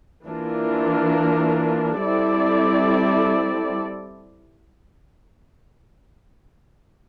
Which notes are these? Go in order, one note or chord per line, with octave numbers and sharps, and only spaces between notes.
E3 A#3 D4 F4 A#4
G3 C4 E4 A4 D5